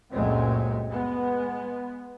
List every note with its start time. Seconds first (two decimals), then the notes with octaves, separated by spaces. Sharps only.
0.11 C#2 F#2 A#2 G#3 A3 C4
0.89 G#3 B3